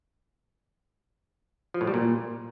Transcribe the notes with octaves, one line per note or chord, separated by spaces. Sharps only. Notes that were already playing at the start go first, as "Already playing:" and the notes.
F3
A2
G3
A#2